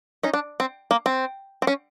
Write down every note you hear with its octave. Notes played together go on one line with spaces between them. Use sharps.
C#4 D#4
D4
C4
A#3
C4
C4
C#4